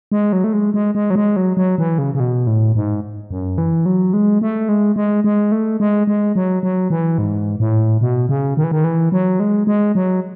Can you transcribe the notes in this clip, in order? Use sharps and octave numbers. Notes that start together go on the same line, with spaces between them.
G#3
F#3
A3
G#3
G#3
G#3
F#3
G#3
F#3
F#3
E3
C#3
C#3
B2
A2
G#2
F#2
E3
F#3
G#3
A3
G#3
G#3
G#3
A3
G#3
G#3
F#3
F#3
E3
G#2
A2
B2
C#3
D#3
E3
D#3
E3
F#3
G#3
G#3
F#3